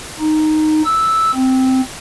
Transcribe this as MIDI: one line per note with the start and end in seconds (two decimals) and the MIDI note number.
0.20 0.82 63
0.85 1.32 88
1.35 1.81 60